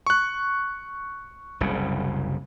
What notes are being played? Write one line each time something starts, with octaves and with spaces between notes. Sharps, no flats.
C#6 F#6
F#1 C2 C#3